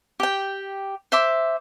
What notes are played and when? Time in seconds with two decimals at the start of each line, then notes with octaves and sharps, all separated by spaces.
0.20 G4 G5
1.12 C5 E5 D6